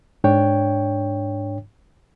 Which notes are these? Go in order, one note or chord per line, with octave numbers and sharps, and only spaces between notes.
G#2 D4 C#5 G5